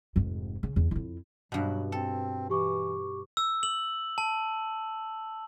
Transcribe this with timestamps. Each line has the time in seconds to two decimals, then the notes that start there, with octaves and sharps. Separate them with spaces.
0.16 F1 G#2
0.63 C#3
0.76 E2
0.91 F2 E4
1.52 G2 B2 F#3
1.92 C4 A4
2.50 E3 G4 C#6 D6
3.37 E6
3.63 F#7
4.18 A5